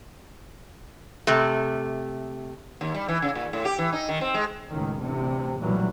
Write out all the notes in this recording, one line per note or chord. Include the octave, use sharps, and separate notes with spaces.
C3 A3
D#2
G3
E3
C#3
A#2
A2
G4
E3
D#4
D#3
C4
G#3
C#2 A2 D#3
A1 D2 C3
F1 B1 A#2 E3 F#3 G3